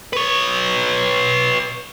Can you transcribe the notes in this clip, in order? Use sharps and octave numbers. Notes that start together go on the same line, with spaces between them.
B4 C#5